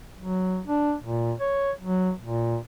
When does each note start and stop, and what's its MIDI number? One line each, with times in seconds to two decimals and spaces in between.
0.19 0.61 54
0.67 0.94 62
1.02 1.33 46
1.40 1.72 73
1.81 2.12 54
2.22 2.58 46